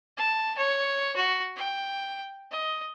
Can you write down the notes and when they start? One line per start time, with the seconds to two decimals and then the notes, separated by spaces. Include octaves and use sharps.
0.17 A5
0.57 C#5
1.16 F#4
1.56 G5
2.51 D#5